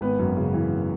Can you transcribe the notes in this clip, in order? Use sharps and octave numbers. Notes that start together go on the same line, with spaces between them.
G#1 B3 B4
F#2
C#3
E3